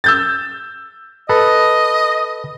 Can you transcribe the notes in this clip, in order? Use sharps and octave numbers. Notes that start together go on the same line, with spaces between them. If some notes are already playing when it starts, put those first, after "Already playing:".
E6 G6 A6
A4 B4 D#5